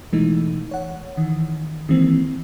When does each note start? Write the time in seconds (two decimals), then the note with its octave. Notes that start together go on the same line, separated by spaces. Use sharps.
0.12 B2 E3 G#3 A3 D#4
0.71 C#5 F#5
1.17 D#3 E3
1.89 D#3 E3 G#3 A#3 C4